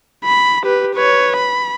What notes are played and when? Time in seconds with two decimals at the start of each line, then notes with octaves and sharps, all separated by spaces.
0.25 B5
0.63 G4 B4
0.95 B4 C#5
1.37 B5